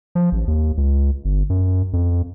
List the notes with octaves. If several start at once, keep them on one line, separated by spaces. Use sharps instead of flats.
F3
A1
D#2
C#2
G1
F#2
F2